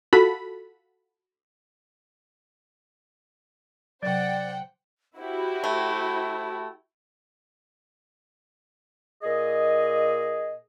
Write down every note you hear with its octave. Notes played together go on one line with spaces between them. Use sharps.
F4 F#4 A4 B5
C3 F#3 C5 D5 F#5 G5
E4 F#4 G4 C5
A3
A#2 G#4 D#5